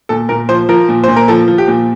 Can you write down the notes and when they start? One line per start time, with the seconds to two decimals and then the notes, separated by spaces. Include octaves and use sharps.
0.09 A#2 A4
0.29 A#2 A#4
0.49 F3 C5
0.69 F3 A#4
0.89 A#2
1.04 A#2 C5
1.16 A#4
1.28 F3 A4
1.48 F3
1.58 G4
1.68 A#2